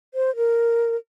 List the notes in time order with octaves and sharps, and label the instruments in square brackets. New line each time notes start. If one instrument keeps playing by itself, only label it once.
[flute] C5
A#4